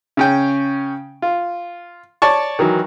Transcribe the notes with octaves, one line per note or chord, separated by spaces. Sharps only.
C#3 C#4 G5
F4
C#5 D5 A5 C#6
D#3 E3 F#3